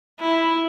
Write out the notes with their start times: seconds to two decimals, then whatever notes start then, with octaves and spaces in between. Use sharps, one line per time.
0.20 E4